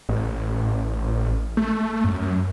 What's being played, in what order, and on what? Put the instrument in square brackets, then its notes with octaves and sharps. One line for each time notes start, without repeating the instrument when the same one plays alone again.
[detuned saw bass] A1
A3
F#2